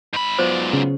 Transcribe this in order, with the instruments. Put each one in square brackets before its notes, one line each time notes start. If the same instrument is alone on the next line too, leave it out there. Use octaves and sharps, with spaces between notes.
[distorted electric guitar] G#2 B5
[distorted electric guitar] G#2 D5 [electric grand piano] F#3 B3 F4 [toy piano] C5
[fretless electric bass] C#3